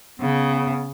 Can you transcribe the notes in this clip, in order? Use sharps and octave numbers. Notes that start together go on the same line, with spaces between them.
C#3 B3